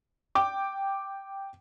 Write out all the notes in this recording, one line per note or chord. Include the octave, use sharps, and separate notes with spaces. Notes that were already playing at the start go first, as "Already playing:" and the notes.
G5 D6